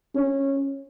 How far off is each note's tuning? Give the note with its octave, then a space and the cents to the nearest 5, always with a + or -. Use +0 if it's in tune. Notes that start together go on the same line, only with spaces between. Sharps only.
C#4 -15